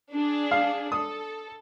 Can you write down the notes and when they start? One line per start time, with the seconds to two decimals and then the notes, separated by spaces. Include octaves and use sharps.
0.13 D4 G#4
0.51 F5
0.92 A4 D#6